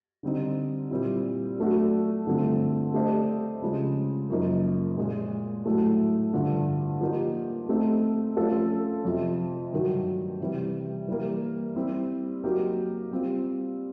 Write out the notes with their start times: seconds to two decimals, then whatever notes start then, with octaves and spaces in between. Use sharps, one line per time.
0.23 D3 G3 C4 D#4
0.91 A#2 G3 C4 E4
1.59 F#3 A3 D4 F#4
2.26 G2 D3 F3 A3 C4
2.94 A3 D4 G4 C5 D#5
3.62 C#3 F3 G#3
4.30 F#2 C#3 F3 A#3 D#4
4.97 A#2 F3 G#3
5.66 A2 F#3 A3
6.33 G2 D3 F3
7.01 F3 A#3 D#4 G4
7.69 A3 C4 D#4
8.37 F3 A3 C#4 F4 A4
9.05 F2 C3 F3
9.72 G2 D#3 F#3
10.40 C3 E3 G3
11.08 E3 G3 A#3
11.76 G3 C4 E4 G4
12.44 F#3 A#3 D#4 G4 A#4
13.11 G3 C4 F4